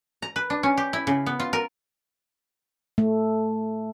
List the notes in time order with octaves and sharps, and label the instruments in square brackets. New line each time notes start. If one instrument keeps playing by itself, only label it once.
[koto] A#5
B4
D4
C#4
G4
E4
C#3
B3
F4
A#4
[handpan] A3